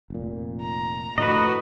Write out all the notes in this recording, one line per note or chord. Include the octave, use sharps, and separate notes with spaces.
F1 A#2
A#5
A2 D3 F3 F#4 B4 D#5